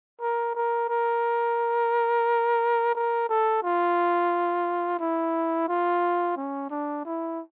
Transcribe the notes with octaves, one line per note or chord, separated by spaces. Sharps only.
A#4
A#4
A#4
A#4
A4
F4
E4
F4
C#4
D4
E4